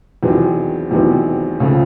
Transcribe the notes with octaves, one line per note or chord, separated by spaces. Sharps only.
E2 C3 D#3 F#3 B3
E2 C3 D#3 F#3 B3
C#2 C#3 F3 A3